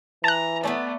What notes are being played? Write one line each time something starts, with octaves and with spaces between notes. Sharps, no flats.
E3 A5 A#5 F#6
A3 B3 C#4 D5